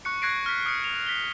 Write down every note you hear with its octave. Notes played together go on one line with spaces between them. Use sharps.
C#6 F#6 C#7
C#6 F#6 G#6 A#6 C7 D7
F6 B6
C#6 D#6 F6 C7 C#7
F7
B6 G7